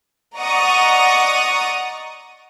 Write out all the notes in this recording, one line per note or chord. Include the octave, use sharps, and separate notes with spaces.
D5 D#5 F#5 A#5 C#6 D#6